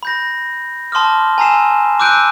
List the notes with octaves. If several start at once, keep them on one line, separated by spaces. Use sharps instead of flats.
B5 G6 A#6
A5 C6 D6 D#6 F6
G#5 A#5 E6 C7 E7
D6 E6 F#6 G6 D7 D#7